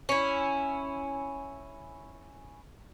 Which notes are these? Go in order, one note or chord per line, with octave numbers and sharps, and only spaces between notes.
C#4 E4